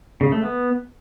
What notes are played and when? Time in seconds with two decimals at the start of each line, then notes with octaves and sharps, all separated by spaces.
0.21 C#3
0.32 A3
0.43 B3